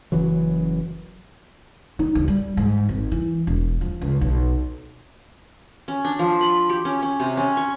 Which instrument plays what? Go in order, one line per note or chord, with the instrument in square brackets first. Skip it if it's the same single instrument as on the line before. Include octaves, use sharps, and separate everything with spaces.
[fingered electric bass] F#1 F#2 E3 F#3
[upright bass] D#4
D2
G3
G#2
G#1
E3
E1
F3
C#2
B1
[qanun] C#4
D4
F3
B5
G4
C#4
C#4
C3
C#4
C#6